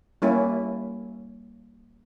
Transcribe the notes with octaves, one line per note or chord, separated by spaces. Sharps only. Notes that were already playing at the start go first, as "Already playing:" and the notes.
G3 A#3 C#4 E4